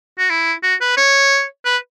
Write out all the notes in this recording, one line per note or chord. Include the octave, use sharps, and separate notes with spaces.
F#4
E4
F#4
B4
C#5
B4